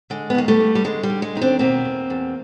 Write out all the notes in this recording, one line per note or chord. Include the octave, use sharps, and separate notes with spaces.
D3 G#3
B3
D#2 A#3
G3 A3
D#2
G3
D3 G#3
G3
D3
G#3
D#2 D#4
C4 D4
B2 A#3 C4
E2
E2